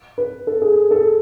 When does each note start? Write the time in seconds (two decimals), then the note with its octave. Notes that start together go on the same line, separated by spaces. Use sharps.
0.18 B4
0.47 A4
0.62 G#4
0.91 A4